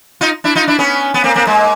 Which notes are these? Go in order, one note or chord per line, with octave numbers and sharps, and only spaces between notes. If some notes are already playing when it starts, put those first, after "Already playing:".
D#4 F4
D4 E4
D#4 F4
D4 E4
B3 C#4
B3
A#3 C4
A#3 C4
G#3 A#3